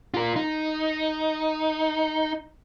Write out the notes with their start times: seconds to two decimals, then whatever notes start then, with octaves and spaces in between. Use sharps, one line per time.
0.14 F4 A#4
0.36 D#4